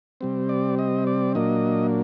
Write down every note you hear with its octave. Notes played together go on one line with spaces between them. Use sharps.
C3 G3 C4
D5
D#5
D5
A#2 F#3 A#3 D4 D#5